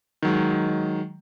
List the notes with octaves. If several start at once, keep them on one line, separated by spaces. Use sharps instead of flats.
D#3 F#3 G#3